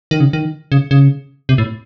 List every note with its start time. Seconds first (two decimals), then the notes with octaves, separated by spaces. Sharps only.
0.11 D#3
0.20 C#3
0.33 D#3
0.72 C#3
0.91 C#3
1.49 C3
1.58 A2